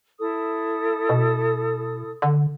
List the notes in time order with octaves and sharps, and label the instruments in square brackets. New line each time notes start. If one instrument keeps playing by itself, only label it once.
[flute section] E4 A4 D#6
[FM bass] B2
D3